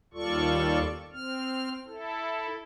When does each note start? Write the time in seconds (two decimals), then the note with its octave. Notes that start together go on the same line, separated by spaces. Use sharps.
0.14 D#2 G3 F4 A4 D5 C#6
1.13 C4 F6
1.87 E4 A4